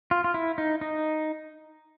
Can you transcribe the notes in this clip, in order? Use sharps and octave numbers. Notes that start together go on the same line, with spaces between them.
F4
F4
E4
D#4
D#4